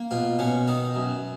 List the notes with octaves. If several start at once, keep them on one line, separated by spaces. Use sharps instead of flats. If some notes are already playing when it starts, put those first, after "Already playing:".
Already playing: A#3
B2 F4
B2 C#4
D#3 D#4
F#2